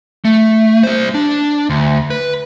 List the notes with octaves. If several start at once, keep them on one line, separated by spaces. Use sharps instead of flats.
A3
G3 C5
D4
D2
B4